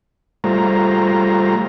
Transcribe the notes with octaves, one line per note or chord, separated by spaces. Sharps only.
G3 A3 F4 C5 A#5